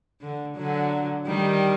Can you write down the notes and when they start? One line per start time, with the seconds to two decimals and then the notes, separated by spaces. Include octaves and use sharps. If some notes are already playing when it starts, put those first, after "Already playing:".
0.21 D3
0.57 D3 F#3
1.27 D#3 G3